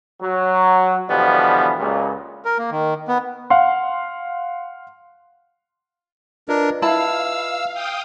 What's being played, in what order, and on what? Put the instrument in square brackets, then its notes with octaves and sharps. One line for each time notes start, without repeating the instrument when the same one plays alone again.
[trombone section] F#3
B2 D3 E3 F3 G3 B3
C#2 A#2
[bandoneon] A#4
A#3
D#3
B3
[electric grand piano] F5 F#5 C6
[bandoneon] D4 A#4 [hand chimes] F4 B4 D#5
[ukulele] E4 A5 B5 [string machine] F5 [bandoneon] E6
[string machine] F5 G5 D#6